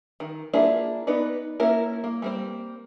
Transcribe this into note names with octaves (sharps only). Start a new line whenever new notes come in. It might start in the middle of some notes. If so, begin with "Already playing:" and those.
D#3
A#3 D4 E4 F4 G#4
B3 D#4 B4 D5
A#3 C#4 E4 A#4
A#3
G3 A#3 C4